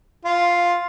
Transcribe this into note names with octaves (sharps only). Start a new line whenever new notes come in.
F4